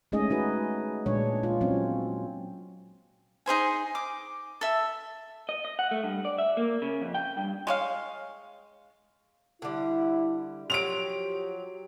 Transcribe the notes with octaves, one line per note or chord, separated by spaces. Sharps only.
G#3 A3 C#4 D#4 G#4 D#5
D#4 F#4 B4
A#2 G#3 D4 C#5
F4
F#3 C4 C#4
D#4 G#4 C5 G#5
D6
A4 E5
D#5
D#5
F#5
A3
G2
D5
E5
A#3
C#3
F2
G5
G2
G#3 C#5 F5
D3 G3 E4
F3 F#3 G4 D7 F7